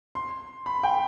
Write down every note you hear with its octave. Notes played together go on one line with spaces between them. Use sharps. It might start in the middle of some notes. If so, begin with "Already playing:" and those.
C6
B5
G5